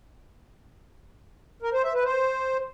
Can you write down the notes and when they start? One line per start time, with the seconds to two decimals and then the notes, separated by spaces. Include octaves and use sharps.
1.62 A#4
1.73 C5
1.83 E5
1.94 B4
2.04 C5